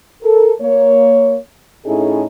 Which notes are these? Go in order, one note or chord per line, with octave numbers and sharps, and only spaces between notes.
A4 A#4
A#3 C#5
A2 C#4 D#4 E4 G#4 A4